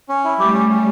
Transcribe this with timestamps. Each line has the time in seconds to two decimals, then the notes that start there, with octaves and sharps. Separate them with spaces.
0.09 C#4
0.24 E4
0.39 G3 A3 G4
0.54 C#4
0.69 C#4